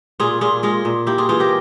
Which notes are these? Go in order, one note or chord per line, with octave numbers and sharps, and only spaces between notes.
A#2 F4 G#4
A#2 F4 G#4
G#3 F4 G#4
A#2
A#3 E4 G4
F4 G#4
E3 F4 G#4
G4 A#4